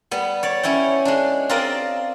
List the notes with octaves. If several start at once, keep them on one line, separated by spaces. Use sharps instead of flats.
G3 B3
C#5 D5
C#4 E4 C#5 G5
G#3 D4
C4 F4 A#4 D5 D#5